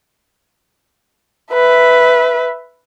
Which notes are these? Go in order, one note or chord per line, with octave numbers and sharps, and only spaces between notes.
B4 E5